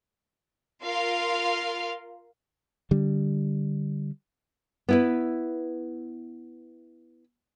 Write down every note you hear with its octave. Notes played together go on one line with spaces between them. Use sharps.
F4 A#4 F5 C6 F6
D3 G3
B3 E4 B4